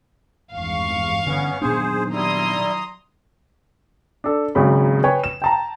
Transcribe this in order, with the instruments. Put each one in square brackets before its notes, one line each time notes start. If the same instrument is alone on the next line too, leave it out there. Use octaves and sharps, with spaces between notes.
[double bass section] G#1 E2 G2 [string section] F5 C#6
[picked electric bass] D3 [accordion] B3 C#4
[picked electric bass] A#2 B3 D4 [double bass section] D#3 F#3 [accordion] G#4 C5
[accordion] G3 E4 [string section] A#5 C6 D#6
[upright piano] D4 A4
G#1 C#3 F#3 B5
B4 C#5 G5 G#5
E7
G5 A5 A#5